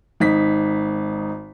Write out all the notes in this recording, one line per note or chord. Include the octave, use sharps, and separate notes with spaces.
G#1 D#4 B6